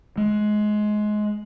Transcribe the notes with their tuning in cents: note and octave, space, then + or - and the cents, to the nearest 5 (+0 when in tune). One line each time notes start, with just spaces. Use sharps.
G#3 +20